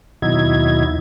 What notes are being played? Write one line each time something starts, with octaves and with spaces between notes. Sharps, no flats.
D#2 B2 F#3 D#4 E4 G#6